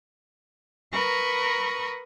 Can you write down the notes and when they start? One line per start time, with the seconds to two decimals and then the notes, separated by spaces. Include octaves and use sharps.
0.93 A#4 B4 A#5 B5 C#6 D#6